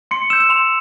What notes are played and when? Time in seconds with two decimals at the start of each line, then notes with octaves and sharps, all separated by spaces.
0.11 C6 C#7
0.30 E6 G6 E7
0.40 E7
0.50 C6 F7